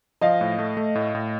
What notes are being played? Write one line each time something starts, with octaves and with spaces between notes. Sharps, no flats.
F3 D#5 F5
A2
A3
A3
A2
A2